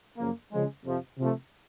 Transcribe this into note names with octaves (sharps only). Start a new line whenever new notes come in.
F#2 C#3 F3 A#3
C#3 F3 G#3
F2 C3 F3
C3 F3 A3